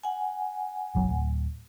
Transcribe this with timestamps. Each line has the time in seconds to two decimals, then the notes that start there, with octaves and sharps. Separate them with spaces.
0.03 F#5 G#5
0.95 F#1 B1 F#3
1.09 D1